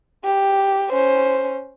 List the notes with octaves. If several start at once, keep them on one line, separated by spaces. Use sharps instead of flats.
G4
C#4 C5